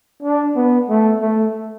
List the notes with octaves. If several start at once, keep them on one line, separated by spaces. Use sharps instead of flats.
D4
B3
A3
A3